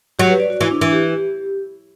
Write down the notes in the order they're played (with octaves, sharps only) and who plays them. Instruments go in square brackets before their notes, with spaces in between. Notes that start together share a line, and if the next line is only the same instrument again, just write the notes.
[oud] F#3 [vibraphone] G4
[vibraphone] B4
D5
F#4
[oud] E3 [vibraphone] E4
[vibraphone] D4
[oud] E3 [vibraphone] E4
[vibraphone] G4
G4